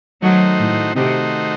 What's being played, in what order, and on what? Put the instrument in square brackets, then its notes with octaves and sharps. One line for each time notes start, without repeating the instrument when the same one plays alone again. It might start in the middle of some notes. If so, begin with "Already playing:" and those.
[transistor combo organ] D#3 A3 D#4 F#4 C5 [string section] F#3
[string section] A2
[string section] C3 [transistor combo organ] D#3 A3 D#4 F#4 C5